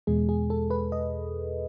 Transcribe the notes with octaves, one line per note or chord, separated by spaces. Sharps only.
E2 B2 G#3 G#4
G#4
A4
B4
D#5